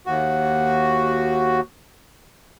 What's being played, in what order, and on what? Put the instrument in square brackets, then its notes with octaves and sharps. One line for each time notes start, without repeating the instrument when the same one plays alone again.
[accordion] D#2 F#4